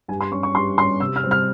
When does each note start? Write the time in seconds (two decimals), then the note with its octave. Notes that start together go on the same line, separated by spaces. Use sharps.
0.08 G2 G#5
0.21 C6
0.31 G3 C#4 C#6
0.43 C#6
0.55 G2 C6
0.78 G3 C6
0.82 C#4
1.00 C3 E6
1.16 F6
1.24 G3 C4
1.31 F6